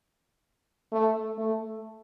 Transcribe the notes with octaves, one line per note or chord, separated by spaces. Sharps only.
A3
A3